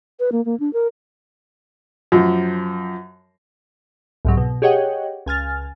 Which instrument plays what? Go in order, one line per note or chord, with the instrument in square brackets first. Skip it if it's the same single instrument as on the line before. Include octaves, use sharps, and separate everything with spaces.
[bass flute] B4
A#3
A#3
D4
A#4
[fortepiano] F#2 F3
[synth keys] C2 G#2 F#3
B2
G4 G#4 C#5 D#5 F#5 G5
C#2 G#5 F6 A6